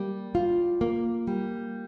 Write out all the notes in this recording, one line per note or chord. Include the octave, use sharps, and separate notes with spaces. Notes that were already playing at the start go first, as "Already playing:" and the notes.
Already playing: G3 A#3
F4
A#3
G3